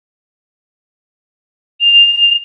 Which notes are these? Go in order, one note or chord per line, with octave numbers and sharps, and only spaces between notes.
F7